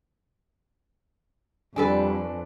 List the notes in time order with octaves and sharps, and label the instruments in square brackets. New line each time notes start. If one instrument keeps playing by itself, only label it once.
[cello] F2 [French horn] G3 [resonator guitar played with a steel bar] D4 A4 B4 [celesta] G#5